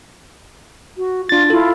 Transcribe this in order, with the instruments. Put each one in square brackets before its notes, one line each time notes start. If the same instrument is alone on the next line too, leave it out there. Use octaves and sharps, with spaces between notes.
[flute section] F#4
[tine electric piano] D4 A6 [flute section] F4
[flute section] E4 F4 [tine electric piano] A4